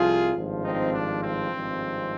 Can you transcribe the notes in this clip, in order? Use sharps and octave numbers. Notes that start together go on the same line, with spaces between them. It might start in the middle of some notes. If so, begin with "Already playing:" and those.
Already playing: C2 C3 F3 F4 G#4
G#1 G2 F3
C4 D#4
D4
C4
G#1 G2 F3 G#3